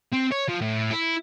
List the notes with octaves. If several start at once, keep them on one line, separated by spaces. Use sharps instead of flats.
C4
C#5
F3
A2
E4